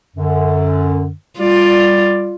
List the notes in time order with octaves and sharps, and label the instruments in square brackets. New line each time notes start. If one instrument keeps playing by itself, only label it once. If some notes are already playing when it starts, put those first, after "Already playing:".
[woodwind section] F#2 D3
[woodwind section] G3 D5 [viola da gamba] F4